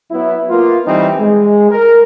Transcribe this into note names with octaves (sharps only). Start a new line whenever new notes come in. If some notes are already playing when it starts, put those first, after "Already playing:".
F#3 B3 E4
A#3 B3 F4
E3 G3 C4 D#4
G#3
A#4